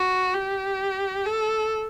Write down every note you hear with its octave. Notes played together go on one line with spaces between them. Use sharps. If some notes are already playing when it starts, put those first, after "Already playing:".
Already playing: F#4
G4
A4